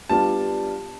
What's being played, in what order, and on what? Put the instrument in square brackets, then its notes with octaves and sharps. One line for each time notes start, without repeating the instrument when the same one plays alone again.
[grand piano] G3 B3 D4 F4 [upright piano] A5